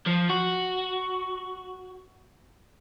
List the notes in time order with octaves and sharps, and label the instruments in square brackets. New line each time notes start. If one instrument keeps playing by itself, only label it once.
[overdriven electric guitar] F3
F#4